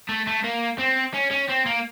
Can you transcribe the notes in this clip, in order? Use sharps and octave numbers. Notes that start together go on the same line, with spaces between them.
A3
A3
A#3
C4
C#4
C#4
C4
A#3